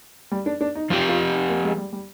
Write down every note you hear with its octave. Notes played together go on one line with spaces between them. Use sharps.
G3
D4
D4
D#4
F3 C4 F4 G4
F4
D#4
A#3
G#3
G3
G3